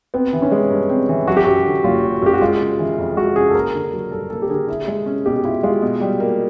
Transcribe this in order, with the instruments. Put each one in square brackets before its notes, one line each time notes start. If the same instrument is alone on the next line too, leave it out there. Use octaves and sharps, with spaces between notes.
[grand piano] B3 [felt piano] C4
[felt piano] E3
[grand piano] C#4
[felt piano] G#3
G2
C4
E3
[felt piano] F#3 [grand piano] F#4
[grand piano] G4
[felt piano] F#2 [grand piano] F#4
[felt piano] D3
[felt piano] F#1 [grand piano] F4
[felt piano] F#3
[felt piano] F#2 [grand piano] G4
[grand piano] F#4
[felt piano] G#3 [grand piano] F4
[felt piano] C#3
E3
F2
[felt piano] G#3 [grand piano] F#4
[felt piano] C#3 [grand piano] G#4
[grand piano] A4
[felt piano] A#3 [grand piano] A#4
[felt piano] D3
F#3
[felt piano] G2 [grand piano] A4
[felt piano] A#3 [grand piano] A4
[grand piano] G4
[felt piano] D3 [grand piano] G#4
[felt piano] E4
G#3
C#4
[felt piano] B2 [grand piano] G4
[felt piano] E4 [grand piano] F4
[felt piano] G#3 [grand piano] F4
[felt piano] B2
G3
A#3